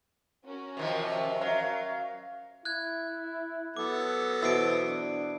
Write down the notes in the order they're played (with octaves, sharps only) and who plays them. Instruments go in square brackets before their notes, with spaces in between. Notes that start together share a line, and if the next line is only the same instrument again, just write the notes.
[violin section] C#4 F#4 A#4
[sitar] C3 D#3 F3
[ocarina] E5
[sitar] F#3 [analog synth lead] F5
[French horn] E4 [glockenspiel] F#6 G#6
[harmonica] F#3 B3 A4 [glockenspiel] D6
[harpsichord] B2 E3 [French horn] C5 [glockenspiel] E6 C7 D7
[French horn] D4